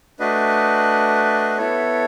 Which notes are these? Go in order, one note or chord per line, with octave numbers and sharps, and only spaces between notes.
A3 D4 F#4 B4 D#5
B3 E4 A4 C#5